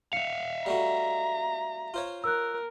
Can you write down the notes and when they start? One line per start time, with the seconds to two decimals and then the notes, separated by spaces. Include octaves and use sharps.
0.13 E5 F5 C#7 F7
0.66 G3 A3 F#4 A#5
1.94 F4 C5 C#5
2.24 A#4 E6 F#6